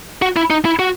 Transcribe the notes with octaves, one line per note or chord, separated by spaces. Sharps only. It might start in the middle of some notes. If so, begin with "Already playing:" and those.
F#4
E4
D#4
E4
F#4